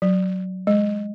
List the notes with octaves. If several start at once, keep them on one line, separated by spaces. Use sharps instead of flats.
F#3
G#3